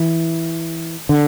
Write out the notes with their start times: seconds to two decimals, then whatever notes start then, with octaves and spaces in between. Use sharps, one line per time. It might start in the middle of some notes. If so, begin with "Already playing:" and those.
Already playing: E3
1.09 D3